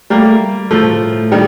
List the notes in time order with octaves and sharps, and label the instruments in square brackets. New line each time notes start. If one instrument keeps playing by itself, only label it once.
[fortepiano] G3 A#3 [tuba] A3
[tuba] G3
[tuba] A2 [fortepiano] F3 A3
[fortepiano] D#3 G3